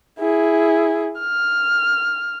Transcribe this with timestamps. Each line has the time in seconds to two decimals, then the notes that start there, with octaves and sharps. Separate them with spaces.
0.19 E4 G#4
1.19 F6